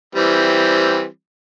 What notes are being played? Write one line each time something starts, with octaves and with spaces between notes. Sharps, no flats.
E3 G3 C4